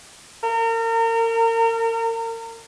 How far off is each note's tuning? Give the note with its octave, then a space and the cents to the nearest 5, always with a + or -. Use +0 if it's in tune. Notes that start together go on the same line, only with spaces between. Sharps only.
A#4 -35